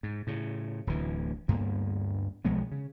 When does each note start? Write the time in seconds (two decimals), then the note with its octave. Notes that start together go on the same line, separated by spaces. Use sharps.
0.03 G#2
0.27 A2 C#3
0.87 D1 D2 E3
1.48 D2 G2 A#3 B3
2.45 B1 F3 G#3 B3
2.72 C#3